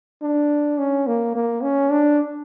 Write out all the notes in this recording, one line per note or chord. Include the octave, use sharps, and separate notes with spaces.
D4
C#4
A#3
A#3
C#4
D4